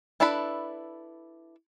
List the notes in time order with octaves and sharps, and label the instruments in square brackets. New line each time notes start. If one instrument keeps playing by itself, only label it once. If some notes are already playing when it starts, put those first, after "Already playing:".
[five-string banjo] D4 E4 A4 B4 B5